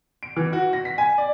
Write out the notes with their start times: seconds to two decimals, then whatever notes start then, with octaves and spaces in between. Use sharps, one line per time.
0.23 D7
0.36 E3
0.53 F#4
0.73 A#6
0.85 B6
0.98 G#5
1.18 D5